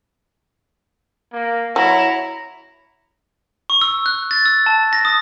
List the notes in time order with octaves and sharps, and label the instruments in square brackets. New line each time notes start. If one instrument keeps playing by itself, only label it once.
[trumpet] A#3
[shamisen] F#3 [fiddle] E4 C#5 [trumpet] A#5
[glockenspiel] C#6
E6
F#6
A6
E6
A5
A#6
D#6